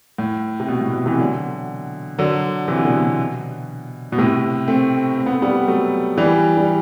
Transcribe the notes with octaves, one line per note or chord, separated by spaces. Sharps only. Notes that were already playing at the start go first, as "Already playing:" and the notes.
A2
C3
B2
A2
B2
C3 E3
D3 F#3
D3 F#3
C3 E3
B2 D3
B2
B2
A2 C3
A3 C4
C4
B3
A3
G3 B3
F#3 A3
E3 G3
G3